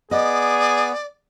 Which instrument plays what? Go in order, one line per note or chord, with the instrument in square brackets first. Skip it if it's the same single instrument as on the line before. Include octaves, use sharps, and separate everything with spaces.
[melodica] B3 [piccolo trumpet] G#4 [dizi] D5 [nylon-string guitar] D#5